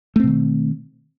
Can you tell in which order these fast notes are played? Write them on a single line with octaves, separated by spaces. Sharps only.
A3 C4 B2 D#3